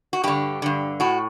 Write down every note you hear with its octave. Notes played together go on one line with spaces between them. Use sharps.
F#4
G2 D3 G4
G2 D3
A2 F#4